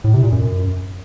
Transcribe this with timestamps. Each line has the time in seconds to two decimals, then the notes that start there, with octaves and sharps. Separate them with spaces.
0.04 A2
0.14 C3
0.23 A#2
0.32 F#2